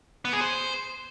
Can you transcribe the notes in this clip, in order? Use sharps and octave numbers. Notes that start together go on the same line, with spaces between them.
B3
G#4
C5